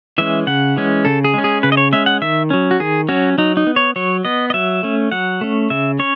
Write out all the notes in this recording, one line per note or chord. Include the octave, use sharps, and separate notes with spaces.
E3 G#3 C#4 E5
C#3 F#5
E3 G#3 C#4
C#3 A4
G#4
G#3 C#4
G#4
C#3 B4
D#5
C#5
G#3 C#4 E5
F#5
D#3 E5
F#3 C#4
F#4
D#3 G#4
F#3 C#4 F#4
F#3 D#4
D#4
B3
C#5
F#3 C#5
B3 D#5
D#5
F#3 E5
A3 C#4
F#3 F#5
A3 C#4
C#3 E5
C#4 C#5